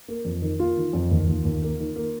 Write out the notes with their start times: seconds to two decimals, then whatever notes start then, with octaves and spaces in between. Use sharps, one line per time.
0.08 A#3
0.25 F2
0.42 D#3
0.59 A#3 F4
0.77 D#3
0.93 F2
1.11 D#2
1.28 D#2
1.45 D#2
1.62 A#3
1.79 D#3
1.96 A#3